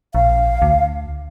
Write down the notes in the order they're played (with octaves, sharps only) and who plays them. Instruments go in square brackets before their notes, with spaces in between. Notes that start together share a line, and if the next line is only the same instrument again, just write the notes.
[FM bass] A#1 [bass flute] F5
[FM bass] D2